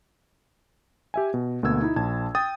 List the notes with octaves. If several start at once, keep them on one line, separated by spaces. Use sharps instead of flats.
G4 E5 G#5
B2
D2 B2 A#3 E6 G#6
D#4 E4
A#1 A5 G#6
G5 D#6 A6